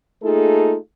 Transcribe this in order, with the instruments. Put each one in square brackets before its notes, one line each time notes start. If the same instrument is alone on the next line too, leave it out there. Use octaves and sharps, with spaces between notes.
[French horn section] A3 A#3 D#4 F4 G#4 A4